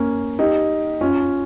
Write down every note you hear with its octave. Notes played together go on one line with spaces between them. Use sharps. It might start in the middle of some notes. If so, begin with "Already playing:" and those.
Already playing: A#3 C#4
D#4 G4
C#4 F4